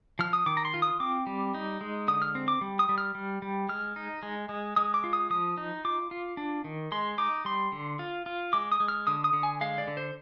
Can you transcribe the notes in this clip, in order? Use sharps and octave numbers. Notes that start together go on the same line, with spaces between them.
F3 F6
D#6
D#3 D6
A#5
C6
F4
D#6
C4 D6
G3
D#4
G#3
D3 D#6
F6
C4
D6
G3
D#6
G3
F6
G3
G3
G#3 F6
D#4
G#3
G#3
G#3 D#6
D6
F4
D#6
F3 D#6
D#4
F4 D6
F4
D4
D#3
G#3 C6
D#4 D6
G3 C6
D3
F4
F4
G#3 D6
D#6
G#3
F6
D3 D#6
D#6
D3
G#5
G#3 F5
D5
D3
C5